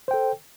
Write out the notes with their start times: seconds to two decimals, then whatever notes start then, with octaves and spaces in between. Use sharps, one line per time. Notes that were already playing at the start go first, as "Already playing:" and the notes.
0.08 C5
0.11 G5
0.14 A4